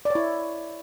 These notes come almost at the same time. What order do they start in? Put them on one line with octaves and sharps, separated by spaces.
D5 C#5 E4